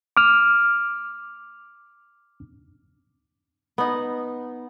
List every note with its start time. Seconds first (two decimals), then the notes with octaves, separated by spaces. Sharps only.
0.17 D6 F6
3.78 B3 D#4